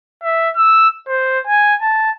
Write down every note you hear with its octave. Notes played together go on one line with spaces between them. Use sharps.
E5
E6
C5
G#5
A5